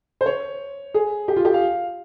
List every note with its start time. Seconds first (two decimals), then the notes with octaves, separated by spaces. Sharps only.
0.21 C5
0.26 C#5
0.94 G#4
1.28 G4
1.36 F4
1.45 G4
1.54 F5